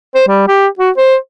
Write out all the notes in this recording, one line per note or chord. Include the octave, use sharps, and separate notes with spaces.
C5
G3
G4
F#4
C5